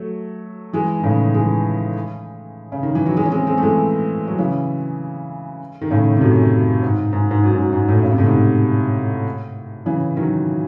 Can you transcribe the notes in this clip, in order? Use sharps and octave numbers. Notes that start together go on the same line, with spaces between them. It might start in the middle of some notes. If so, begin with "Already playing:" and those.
Already playing: F#3 A3
E3 G#3
D#3
A2 C#3
E3 G#3
C#3
D#3
E3
F#3
E3 G#3
C#4
G#3 C4
G#3 C4
A3
E3 G#3
F#3
C#3 E3
D#3
A2 C#3
C3
F#2 A2
F#2
G#2
G#2
G#2
F#2
G#2
F#2
G#2
F#2 A2
C#3
C3
A2
G#2 C3
C#3 E3
D#3 F#3